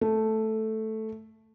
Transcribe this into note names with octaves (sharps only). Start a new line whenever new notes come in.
A3